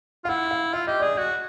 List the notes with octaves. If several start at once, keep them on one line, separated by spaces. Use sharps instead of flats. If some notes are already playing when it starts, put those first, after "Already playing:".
F4 F5
E4 F#5
F5
F4 E5
G4 D#5
G#4 D5
F#4 D#5